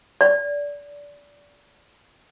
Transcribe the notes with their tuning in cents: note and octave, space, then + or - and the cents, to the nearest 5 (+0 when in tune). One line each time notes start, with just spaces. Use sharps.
D5 -25